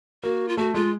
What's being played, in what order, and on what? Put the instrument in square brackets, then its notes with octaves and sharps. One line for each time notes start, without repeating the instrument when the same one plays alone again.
[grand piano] A#3 [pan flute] F#4
[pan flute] F4
[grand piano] A3 [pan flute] F#4
[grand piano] G#3 [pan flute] F4